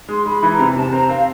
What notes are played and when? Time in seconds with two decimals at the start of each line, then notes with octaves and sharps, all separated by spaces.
0.09 G#3 C6
0.25 G#3 B5
0.43 E3
0.51 A#5
0.59 C3
0.76 C3 A5
0.92 C4 A#5
1.09 C4 F5